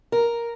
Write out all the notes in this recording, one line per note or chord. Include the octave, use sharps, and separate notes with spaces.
A#4